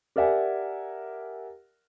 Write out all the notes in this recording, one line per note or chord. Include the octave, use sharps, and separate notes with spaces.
G4 A#4 D5 E5 F#5 G#5